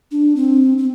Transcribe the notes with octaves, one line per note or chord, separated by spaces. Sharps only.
D4
C4
C4